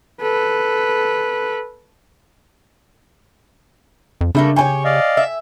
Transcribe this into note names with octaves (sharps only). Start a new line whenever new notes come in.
A4 B4
F2
C#3 G3 A3 A#3 D4
G4 C5 C#5 G5 G#5 C#6
D5 D#5 F5
E5